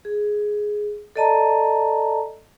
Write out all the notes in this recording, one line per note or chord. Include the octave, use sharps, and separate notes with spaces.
G#4
A4 D5 D#5 A5 A#5